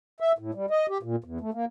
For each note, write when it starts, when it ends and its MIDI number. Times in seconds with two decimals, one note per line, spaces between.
0.20 0.32 76
0.38 0.51 45
0.54 0.66 55
0.70 0.86 75
0.89 0.98 67
1.03 1.16 46
1.24 1.38 40
1.41 1.50 57
1.54 1.65 58